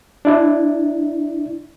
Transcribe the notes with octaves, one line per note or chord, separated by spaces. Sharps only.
D4 E4